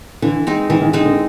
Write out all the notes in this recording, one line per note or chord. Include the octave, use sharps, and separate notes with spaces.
D3 E3
G#3 C4 D#4
D#3 E3
D#3
D3 G#3 C4 D#4
D3